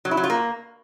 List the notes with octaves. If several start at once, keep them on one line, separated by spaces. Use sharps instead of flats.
F#3
E4
F#3
F4
A#3